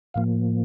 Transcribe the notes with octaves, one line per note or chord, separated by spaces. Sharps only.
A2 F3 A#3 F5